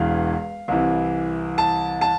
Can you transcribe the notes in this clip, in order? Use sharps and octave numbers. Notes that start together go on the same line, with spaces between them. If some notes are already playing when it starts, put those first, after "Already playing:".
Already playing: E1 E2 E3 F5
C2 C3 E3
A5
A5